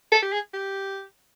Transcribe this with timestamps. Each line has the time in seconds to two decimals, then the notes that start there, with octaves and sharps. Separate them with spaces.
0.12 A4
0.22 G4
0.32 G#4
0.53 G4